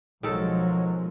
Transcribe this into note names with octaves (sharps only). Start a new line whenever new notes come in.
B1 D#3 F3 F#3 G#3 A4